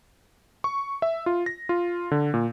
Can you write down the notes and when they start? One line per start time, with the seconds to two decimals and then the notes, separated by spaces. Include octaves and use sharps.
0.64 C#6
1.02 E5
1.26 F4
1.46 A#6
1.69 F4
2.11 D3
2.34 A#2